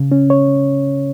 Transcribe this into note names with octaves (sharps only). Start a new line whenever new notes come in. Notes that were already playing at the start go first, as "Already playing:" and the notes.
Already playing: C#3
C#4
C#5